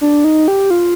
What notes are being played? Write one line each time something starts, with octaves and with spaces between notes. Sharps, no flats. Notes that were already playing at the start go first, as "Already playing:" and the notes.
D4
D#4
G4
F4